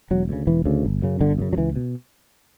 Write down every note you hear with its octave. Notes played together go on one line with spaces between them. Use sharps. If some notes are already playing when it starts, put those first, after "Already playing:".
E1 F#3
D2 C#3
E1 E3
D2 C#3
G1
F#2 C#3
G1 D3
F#2 C#3
F#3
C#2 E3
B2